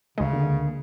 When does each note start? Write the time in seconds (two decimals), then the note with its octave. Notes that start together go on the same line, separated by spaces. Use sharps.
0.18 D2 C#3 G#3
0.33 D3 A#3